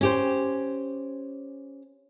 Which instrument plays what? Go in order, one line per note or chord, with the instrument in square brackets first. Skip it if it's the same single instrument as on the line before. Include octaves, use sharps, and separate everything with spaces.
[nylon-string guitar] C#4 G4 C5